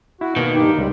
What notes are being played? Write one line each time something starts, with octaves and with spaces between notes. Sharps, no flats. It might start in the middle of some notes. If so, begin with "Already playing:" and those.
E4 F#4
B2 D#3 A#3
G2 D#4 G4
C#2 G3